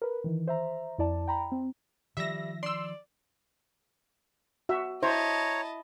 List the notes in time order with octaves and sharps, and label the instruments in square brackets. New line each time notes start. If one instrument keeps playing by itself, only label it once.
[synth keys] A#4 B4
D#3 E3
C5 E5 A#5
F2 E4 D5 A5
G5 A#5 B5
C4
[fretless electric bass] D#3 F3 [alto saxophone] G3 [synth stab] E5 A#6
[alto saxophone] D5 [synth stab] C6 E6
[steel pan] F#4 E5
[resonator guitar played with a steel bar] E4 [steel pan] C5 [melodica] C#5 A#5 [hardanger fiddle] D#5 A5